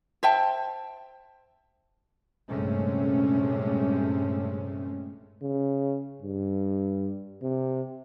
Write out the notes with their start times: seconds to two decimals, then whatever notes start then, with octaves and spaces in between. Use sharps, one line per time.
0.23 C5 E5 G5 A5
2.49 A#1 G2 C3 G#3 A3 C#4
5.42 C#3
6.22 G2
7.42 C3